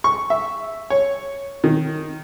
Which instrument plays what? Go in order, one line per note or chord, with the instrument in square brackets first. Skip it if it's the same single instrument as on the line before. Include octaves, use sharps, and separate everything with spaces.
[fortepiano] C#6
E5
C#5
D#3